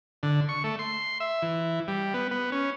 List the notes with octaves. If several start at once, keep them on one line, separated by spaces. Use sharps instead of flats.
D3
C#6
A3
C6
E5
E3
G3
B3
B3
C#4